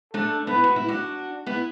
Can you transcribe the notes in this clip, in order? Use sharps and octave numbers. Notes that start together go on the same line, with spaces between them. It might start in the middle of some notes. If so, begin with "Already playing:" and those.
A3 D4 A4
B3 E4 B4
F#4
E4
D4 F#4
B3 E4